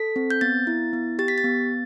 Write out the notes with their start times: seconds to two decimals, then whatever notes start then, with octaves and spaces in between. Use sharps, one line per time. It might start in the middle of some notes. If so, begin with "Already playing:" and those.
Already playing: A4 B6
0.16 C4
0.30 G6
0.41 B3 A6
0.67 E4
0.93 B3
1.19 G4 A6
1.28 B6
1.38 A6
1.44 B3